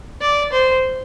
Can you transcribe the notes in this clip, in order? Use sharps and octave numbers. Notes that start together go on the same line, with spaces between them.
D5
C5